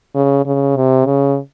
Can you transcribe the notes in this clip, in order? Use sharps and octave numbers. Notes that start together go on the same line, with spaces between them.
C#3
C#3
C3
C#3